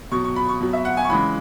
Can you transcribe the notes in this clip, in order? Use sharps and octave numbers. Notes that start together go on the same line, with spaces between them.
B2 F#3 C#6
C#6
B5
C#6
B2 F#3
E5
F#5
G#5
C#6
C#3 E3 G#3 B5